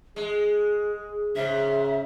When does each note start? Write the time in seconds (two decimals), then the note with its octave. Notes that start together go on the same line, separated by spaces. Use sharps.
0.16 G#3 G#4
1.36 G#2 C#3 E5